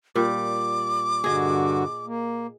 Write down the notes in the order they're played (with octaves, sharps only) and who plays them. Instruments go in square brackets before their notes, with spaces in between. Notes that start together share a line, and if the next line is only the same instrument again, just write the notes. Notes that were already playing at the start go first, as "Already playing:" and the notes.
[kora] A#2 G3 [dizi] D6
[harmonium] G2 D3 F#4 [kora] G#4 D#5
[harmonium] A#3